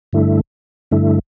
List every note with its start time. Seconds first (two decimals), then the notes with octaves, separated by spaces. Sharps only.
0.13 G2 D3 A3 E4
0.91 G2 D3 A3 E4